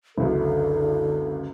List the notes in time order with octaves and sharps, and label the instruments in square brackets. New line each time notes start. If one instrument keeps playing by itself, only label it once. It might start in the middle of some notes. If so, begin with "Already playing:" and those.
[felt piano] F#1 C#2 F#2 [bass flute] D3 [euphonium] A4